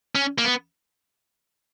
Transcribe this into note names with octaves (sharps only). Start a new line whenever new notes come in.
C#4
A#3
B3